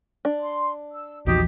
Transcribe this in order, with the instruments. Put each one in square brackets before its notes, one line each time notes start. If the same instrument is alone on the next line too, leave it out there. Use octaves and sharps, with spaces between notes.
[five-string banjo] D4
[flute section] C6
E6
[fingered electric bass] A#1 E2 F3 [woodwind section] D#4 F#4 G4 [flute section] D#6